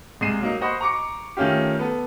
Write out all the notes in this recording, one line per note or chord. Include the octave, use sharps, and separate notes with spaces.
C2 G#3 C7 D#7 E7
F#3 A#3 D#4
C5 D#5 F#5 B5 C#6
A#5 C#6 D6 C#7
D#3 A3 C#4 F4 G4
B3 A4